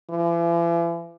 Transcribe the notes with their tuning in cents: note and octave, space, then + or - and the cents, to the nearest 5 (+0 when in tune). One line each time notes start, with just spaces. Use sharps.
E3 +45